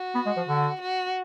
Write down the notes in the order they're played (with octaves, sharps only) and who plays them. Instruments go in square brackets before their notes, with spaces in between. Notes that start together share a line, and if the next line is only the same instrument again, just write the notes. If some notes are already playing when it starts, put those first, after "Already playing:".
Already playing: [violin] F#4
[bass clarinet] B3
G#3
F3
D3
[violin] F#4